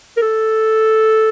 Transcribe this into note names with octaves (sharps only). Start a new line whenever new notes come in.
A#4
A4